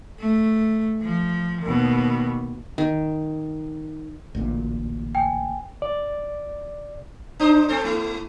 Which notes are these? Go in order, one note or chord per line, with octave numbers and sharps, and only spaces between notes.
A3
F3
D#2 B2
D#3
A1 D2 A#2
G5 G#5
D5
D4 D#4 C5
C4 A4 C5
A3 E4